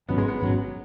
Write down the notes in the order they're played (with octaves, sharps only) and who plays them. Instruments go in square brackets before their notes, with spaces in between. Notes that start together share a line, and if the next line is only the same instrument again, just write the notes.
[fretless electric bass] G#1 G#2 F#3 C#4 [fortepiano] B3
[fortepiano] G#3
B3
[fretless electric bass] G#1 G#2 F#3 C#4